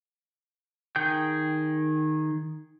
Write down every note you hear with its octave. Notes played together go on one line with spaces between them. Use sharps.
D#3 G#4 G5 G6